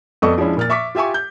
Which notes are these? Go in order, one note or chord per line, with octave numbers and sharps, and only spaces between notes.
F2 B3 A4 D5 D#5 C#6
F3 G#3 C#4 D4 E4
A#2 F6 A6
E5 C#6 D6 B6
F4 G4 E5 G#5 C#6
G6